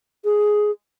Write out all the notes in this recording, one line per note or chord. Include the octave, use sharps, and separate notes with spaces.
G#4